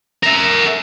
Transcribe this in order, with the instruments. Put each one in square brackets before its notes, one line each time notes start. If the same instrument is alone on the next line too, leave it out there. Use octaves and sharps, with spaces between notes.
[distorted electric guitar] A#4 E5